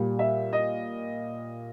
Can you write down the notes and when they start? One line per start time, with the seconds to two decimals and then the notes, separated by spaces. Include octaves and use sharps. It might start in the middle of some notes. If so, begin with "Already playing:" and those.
Already playing: A#2 G3
0.19 E5
0.53 D#5